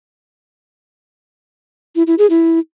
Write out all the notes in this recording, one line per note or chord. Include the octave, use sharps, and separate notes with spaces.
E4
E4
G#4
E4